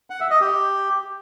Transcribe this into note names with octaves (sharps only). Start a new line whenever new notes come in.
F#5
E5
D#5
G4